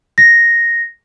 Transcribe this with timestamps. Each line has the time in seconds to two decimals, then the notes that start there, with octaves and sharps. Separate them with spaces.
0.18 A#6